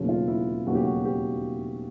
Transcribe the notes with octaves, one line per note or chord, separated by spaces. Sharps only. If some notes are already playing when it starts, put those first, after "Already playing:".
Already playing: E1 D#2 C#3 F#3 A3
F4
E4
E1 D#2 C#3 F#3 A3 F#4
G4
F#4
G4